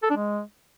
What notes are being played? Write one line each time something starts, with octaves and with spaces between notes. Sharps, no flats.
A4
D4
G#3